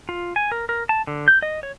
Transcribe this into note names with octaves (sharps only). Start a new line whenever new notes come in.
F4
G#5
A#4
A#4
A5
D3
G6
D#5
C#5